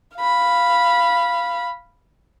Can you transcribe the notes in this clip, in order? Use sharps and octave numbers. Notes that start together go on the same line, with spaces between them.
F5 B5